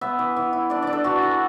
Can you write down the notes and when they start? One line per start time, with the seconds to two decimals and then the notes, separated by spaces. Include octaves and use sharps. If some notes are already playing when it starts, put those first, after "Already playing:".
0.01 B3 E5
0.19 E3
0.36 E3
0.53 E4
0.70 D4 D5
0.82 D4 D5
0.93 A4
1.04 E3 F#4
1.22 E3